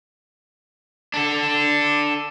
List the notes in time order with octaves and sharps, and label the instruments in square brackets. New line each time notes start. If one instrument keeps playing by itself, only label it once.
[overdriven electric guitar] D4 A4